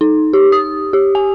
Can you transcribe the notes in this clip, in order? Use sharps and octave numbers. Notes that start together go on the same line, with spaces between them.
D#4
G4
D#6
G4
G#5